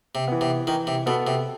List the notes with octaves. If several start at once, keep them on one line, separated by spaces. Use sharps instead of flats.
C3
E3 B3
C3
D#3 E3
C3
B2 B3 F#4 A4
C3